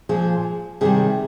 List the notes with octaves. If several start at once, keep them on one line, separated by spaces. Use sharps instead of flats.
A#2 F3 G#4
C3 D#3 G3 G#4